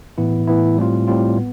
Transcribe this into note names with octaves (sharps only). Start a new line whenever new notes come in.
A2 E3 B3 E4
A2 E3 B3 E4
A2 G3 C4 F4
A2 G3 C4 F4
B3